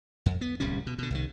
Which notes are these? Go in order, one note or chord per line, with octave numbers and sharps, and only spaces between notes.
F2
B3
D1 C2 G3 C#4
B2
B2 D3
C2 D#3